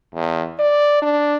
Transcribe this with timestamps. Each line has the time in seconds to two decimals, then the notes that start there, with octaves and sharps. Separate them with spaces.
0.15 E2
0.59 D5
1.02 D4